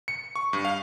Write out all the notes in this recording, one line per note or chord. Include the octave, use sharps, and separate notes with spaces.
C#7
C#6
G2
F5